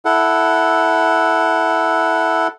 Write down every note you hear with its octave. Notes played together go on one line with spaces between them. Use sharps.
E4 A4 F#5